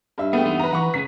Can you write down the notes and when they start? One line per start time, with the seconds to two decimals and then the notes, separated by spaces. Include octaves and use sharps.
0.18 G2 E5
0.33 A3 B3 G#4 G5
0.44 E2 D#4 C6
0.59 B4 A#5
0.73 E3 F#5 C#6
0.94 C#2 C#4 G#4 B6